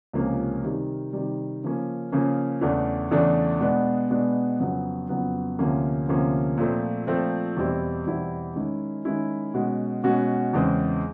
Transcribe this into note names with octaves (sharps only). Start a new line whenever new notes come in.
C#2 C3 F3 A#3 C#4
C3 D#3 G3
C3 D#3 G3
C#3 F3 A#3 C#4
C#3 F3 A#3 C#4
E2 C#3 E3 A3 D4
E2 C#3 E3 A3 D4
B2 G#3 B3 D4
B2 G#3 B3 D4
F2 C#3 F#3 B3
F2 C#3 F#3 B3
D2 C3 F3 A#3 C#4
D2 C3 F3 A#3 C#4
A#2 F3 A3 C4
A#2 F3 A3 C4
E2 B2 G3 C4 E4
E2 B2 G3 C4 E4
D#3 G#3 C#4 E4
D#3 G#3 C#4 E4
B2 G#3 C#4 F#4
B2 G#3 C#4 F#4
E2 C#3 E3 G#3 C4